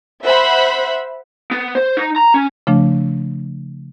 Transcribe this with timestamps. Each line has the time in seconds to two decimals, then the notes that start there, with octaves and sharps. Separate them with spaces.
0.24 C5 E5 F#5 B5
1.51 B3
1.75 C5
1.97 D#4
2.16 A#5
2.34 C#4
2.67 C#3 F3 A3 D4